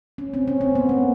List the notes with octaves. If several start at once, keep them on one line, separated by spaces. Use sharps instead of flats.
C#4
C4
C#4
C4
B3
A#3